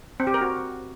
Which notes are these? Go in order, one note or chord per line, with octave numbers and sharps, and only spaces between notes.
C4
G4
A#4
F#4